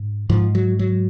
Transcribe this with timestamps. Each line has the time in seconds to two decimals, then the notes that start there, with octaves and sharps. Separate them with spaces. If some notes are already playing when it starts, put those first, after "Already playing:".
Already playing: G#2
0.29 G#2 F3
0.55 F#3
0.79 F#3